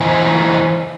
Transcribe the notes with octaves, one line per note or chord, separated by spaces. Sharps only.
E3 E4 C5 D#5 G#5 A#5